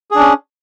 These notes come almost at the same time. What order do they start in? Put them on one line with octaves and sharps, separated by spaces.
G#4 D4 C#4